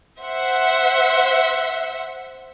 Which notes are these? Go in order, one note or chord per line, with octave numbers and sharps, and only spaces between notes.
C5 E5 F#5